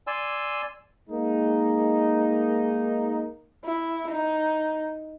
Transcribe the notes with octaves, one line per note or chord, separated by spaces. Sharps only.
D5 G#5 C6 E6
G#3 A#3 D#4
E4
D#4